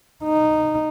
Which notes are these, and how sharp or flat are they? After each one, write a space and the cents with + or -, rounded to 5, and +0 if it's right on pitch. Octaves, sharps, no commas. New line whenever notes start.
D#4 -10